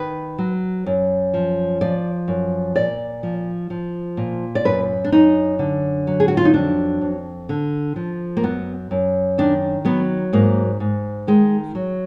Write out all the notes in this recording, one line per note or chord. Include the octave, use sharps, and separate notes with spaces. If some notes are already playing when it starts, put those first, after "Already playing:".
Already playing: D#3 B4
F#3
F#2
F3
F3 D5
F#2
A#2 D5
F3
F3
A#2
D5
F#2 B4
D4
F#2 D#4
D3
F#3
G#4
F#4
F4
D#4
F2 D4
F2
D3
F3
A#3
F#2 B3
F#2
D#3 D4
F#3 B3
G#2 A#3
G#2
D#3 G#3
F#3